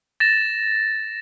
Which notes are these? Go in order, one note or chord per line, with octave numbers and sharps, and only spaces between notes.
A6 A#6 E7